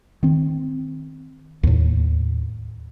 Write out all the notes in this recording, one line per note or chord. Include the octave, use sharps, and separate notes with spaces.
D#3 C4
D#2 A2